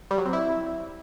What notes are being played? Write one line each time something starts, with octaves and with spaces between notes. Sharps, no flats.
G3
F#3
C4
E4